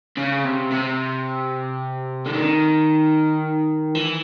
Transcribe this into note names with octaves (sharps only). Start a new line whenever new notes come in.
C#3
C3
C3
D3
D#3
E3